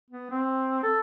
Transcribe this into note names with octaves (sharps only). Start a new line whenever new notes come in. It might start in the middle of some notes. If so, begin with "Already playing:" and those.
B3
C4
A4